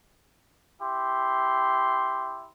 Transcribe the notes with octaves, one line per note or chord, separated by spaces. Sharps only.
E4 G4 C6